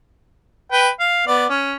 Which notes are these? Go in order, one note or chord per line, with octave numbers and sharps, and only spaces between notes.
B4 G5
F5
B3 D5
C#4